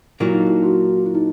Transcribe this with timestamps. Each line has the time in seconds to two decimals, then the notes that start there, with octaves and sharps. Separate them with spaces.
0.20 A#2 F#3 A#3 E4
0.33 D#4
0.47 E4
0.63 F#4
1.06 E4
1.15 D#4